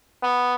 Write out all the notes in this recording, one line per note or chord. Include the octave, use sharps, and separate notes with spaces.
B3